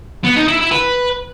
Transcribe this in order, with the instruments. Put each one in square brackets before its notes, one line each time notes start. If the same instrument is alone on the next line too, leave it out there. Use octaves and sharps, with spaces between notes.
[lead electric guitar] B3
D#4
E4
E4
B4